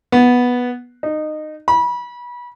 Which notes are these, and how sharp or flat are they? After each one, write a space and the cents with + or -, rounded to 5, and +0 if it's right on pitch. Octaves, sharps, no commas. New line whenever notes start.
B3 -5
D#4 -20
B5 -30